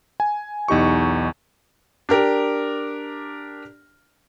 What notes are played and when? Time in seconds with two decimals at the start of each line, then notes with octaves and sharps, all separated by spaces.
0.20 G#5
0.68 B1 E2 D#4 G4 C#6
2.09 D4 G4 A#4